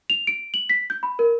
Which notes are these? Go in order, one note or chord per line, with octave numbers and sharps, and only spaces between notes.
F7
D7
F#7
B6
G6
B5
A#4